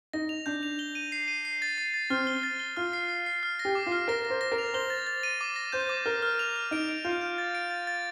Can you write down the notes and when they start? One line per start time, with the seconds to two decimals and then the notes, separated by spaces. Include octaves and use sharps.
0.13 D#4 A#6
0.29 F7
0.46 D4 G6
0.63 F7
0.79 G7
0.95 D#7
1.12 C7
1.28 D#7
1.45 C7
1.62 A6
1.78 C7
1.94 A6
2.10 C4 F6
2.27 G7
2.43 A6
2.60 G7
2.77 F4 F6
2.93 C7
3.09 C7
3.26 C7
3.43 F6
3.59 A#6
3.65 G4
3.75 D6
3.86 F4
3.92 F6
4.08 A#4 A#6
4.25 A#6
4.30 C5
4.41 A#6
4.52 A#4
4.58 F7
4.74 C5 G7
4.90 A6
5.07 A6
5.23 D#7
5.41 D6
5.56 A#6
5.72 C5 G6
5.89 D6
6.06 A#4 F6
6.22 F6
6.39 F7
6.56 F6
6.71 D#4 D7
6.89 D7
7.05 F4 G6
7.21 G6
7.38 A6
7.55 D7
7.71 A6
7.87 A6